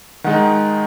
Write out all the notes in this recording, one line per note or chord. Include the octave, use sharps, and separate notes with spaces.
D#3 G#3 D#4 F#5